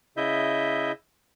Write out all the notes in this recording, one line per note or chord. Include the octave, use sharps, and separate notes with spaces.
C#3 E4 D#5 E5 G6